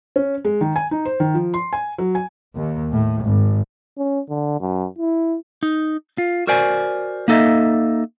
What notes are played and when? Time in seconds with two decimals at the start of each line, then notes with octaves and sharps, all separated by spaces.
0.16 C#4
0.45 G#3
0.61 D#3
0.76 G#5
0.91 D#4
1.05 C5
1.20 D#3
1.34 F3
1.54 C6
1.73 G#5
1.98 F#3
2.15 G#5
2.56 D#2
2.92 A2
3.24 G#1
3.97 C#4
4.29 D3
4.60 F#2
4.98 E4
5.63 D#4
6.18 F4
6.47 F#4 A#4 C5 D5 G#5
7.28 A#3 D#4 A4 D#5 E5